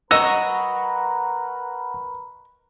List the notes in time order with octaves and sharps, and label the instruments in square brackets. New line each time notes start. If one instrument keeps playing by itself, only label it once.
[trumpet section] A#4 B4 [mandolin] D#5 [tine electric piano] F#5 A#5 C#6 [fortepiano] E6